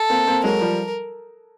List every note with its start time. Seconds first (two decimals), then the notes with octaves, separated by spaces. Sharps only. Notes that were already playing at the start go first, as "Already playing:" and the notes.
Already playing: A4
0.10 A#3 C4
0.27 A#3 C4
0.44 F#3 G#3 A#4
0.61 F3 G3